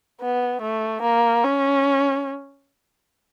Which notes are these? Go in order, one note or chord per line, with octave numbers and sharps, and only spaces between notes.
B3
A3
A#3
C#4